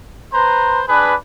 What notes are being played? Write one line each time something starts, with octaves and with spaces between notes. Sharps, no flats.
B4 C5 A#5 C6
D4 G#4 B4